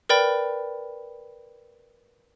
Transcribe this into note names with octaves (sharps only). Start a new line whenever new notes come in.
A#4 B4 D5 G5 B5